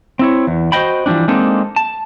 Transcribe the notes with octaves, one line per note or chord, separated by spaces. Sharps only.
C4 E4 C#5
E2
F#4 C5 D5 D#5 G5 B5
E3 F3 G3 C#4 D4
G#3 A#3 C4 D4 D#4 A4
A5